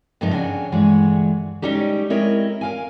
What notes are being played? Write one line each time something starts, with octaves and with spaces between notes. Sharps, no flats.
G2 C3 F3 B3 D#4 A#4
C#3 C4 D4 C#5 F#5 G#5
D2 G2 E3 G#3 C#5 F#5
G3 G#3 C#4 D#4 G4
G#3 C4 E4 A#4 C#5 D#5
A#4 F5 G#5